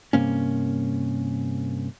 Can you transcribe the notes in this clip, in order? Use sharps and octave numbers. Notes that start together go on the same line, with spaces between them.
G2 C3 A#3 C#4